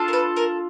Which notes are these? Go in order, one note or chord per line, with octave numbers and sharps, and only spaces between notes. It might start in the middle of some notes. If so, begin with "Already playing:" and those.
Already playing: D4 F4 A4
A#4
B4
A#4